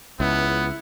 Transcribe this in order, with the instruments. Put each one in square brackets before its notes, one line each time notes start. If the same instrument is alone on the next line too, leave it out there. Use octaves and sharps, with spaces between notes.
[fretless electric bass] C#2 [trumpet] B3 [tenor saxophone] E4